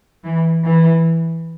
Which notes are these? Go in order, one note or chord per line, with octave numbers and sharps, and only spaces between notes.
E3
E3